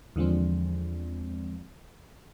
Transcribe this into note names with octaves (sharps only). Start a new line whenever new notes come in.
E2 D3 F3 G#3 C4